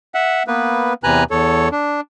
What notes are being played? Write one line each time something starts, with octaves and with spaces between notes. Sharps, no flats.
E5 F#5
A#3 B3 B4
E2 C3 B4 G#5 A#5 F#6
E2 A4 C#5
D4